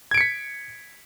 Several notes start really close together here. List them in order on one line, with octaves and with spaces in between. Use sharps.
G#6 D7 C#7 B6